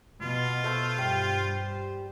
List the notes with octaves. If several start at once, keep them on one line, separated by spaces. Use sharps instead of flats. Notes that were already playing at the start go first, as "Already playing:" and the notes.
B2 F4
A3 C5
G2 G3